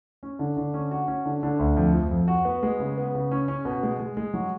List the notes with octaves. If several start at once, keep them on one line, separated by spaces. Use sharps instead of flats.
C#4
D3
D3
C#4
F#4
C#4
D3
D3
D2
F2
F3
F2
F#4
B3
G#3
C#3
B3
C#3
C#4
C#4
B2
G#3
G#3
G#3
F#3